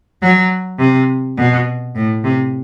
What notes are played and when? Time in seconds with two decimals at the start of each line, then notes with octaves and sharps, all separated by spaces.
0.22 F#3
0.79 C3
1.37 B2
1.96 A2
2.24 C3